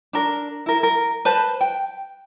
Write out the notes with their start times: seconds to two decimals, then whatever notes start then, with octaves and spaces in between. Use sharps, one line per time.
0.13 D4 A#4
0.66 E4 A#4
0.83 A#4
1.25 B4 C5 A5
1.61 G5